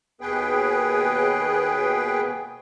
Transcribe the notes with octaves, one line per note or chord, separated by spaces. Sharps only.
D#2 B2 B3 G#4 B4 G5